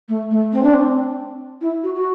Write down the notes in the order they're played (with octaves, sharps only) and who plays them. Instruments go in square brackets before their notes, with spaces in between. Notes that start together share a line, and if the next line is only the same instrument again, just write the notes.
[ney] A3
A3
C4
D4
C4
E4
F#4
F#4